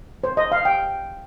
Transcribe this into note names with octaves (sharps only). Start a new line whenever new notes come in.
C5
D#5
F5
G5